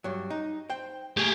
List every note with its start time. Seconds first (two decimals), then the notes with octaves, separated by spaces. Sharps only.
0.04 G2 F#3
0.30 D#4
0.70 C5 G5
1.17 A3 A#3 G4 G#4